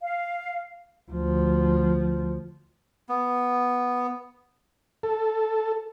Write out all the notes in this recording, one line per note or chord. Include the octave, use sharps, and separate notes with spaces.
F5
D2 F3
B3
A4